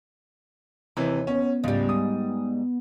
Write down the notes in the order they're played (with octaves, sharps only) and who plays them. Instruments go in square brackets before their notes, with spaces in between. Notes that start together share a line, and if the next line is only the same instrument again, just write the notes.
[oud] D#2 [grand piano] C3 E3
[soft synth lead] B3 [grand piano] C#4
[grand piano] C#2 [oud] G#2 G3
[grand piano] D#6